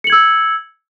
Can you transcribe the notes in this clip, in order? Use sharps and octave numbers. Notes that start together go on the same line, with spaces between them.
E6 G#6 C#7 F#7